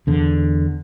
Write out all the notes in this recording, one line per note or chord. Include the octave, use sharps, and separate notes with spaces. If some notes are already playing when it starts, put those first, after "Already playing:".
E2 D3